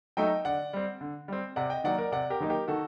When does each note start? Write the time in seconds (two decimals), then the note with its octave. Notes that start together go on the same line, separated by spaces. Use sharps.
0.17 F#3 A3 D#4 D#5 G5
0.45 D3 D5 F#5
0.73 G3 C4
1.01 D3
1.28 G3 C4
1.56 C3 D5 F#5
1.70 D#5 G5
1.84 D#3 F#3 A#3 D#4 D5 F#5
1.98 A#4 D5
2.12 C3 D5 F#5
2.30 G4 A#4
2.40 D#3 F#3 A#3 D#4
2.49 G4 A#4
2.68 D#3 F#4 A4